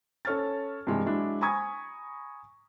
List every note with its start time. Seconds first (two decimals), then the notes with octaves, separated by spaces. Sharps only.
0.25 C#4 A4 C#5 F6 A6
0.87 G2 C3 E3 G#3
1.06 F#3 G#3 D4 E4
1.41 G#5 A#5 B5 C#6 D#6 G#6